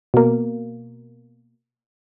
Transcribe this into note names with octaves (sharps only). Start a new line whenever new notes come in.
B2 A#3